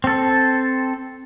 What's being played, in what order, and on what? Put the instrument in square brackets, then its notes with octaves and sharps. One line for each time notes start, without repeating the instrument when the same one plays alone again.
[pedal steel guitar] C4 A4